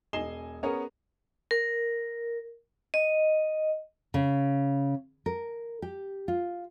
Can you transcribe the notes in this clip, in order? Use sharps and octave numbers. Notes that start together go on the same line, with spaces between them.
E1 D#5 G#5 C7 E7 G7
B3 C#4 G#4 A#4 C#5
A#4
D#5
C#3
A#4
G4
F4